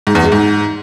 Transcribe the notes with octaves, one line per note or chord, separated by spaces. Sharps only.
G#2
E2
G#3
G#2